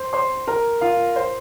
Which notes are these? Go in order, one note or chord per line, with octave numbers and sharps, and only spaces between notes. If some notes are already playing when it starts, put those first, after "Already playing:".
Already playing: C5 C6
C5 C6
A#4 A#5
F4 F5
C5